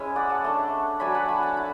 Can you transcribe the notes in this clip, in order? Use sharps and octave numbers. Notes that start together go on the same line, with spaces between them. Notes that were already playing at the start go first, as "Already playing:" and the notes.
Already playing: G#3 C#4 E4 E5 G#5
D5 F#5
F#5 A5
A3 D4
F#3 A3 D4 G#5 B5
F#5 A5
G#5 B5
F#5 A5
E4